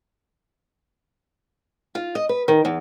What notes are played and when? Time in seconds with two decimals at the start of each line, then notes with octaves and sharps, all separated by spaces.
1.95 F4
2.15 D#5
2.29 B4
2.48 D#3
2.65 E2